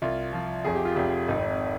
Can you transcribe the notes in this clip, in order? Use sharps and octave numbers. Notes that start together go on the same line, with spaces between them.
C2 F4
F3
F1 G#4
G4
F4
F1 G4
G#1 D#4